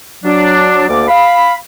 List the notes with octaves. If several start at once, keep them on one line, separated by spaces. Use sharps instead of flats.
F#3 D4
D2 A#3 D5 D6
F5 B5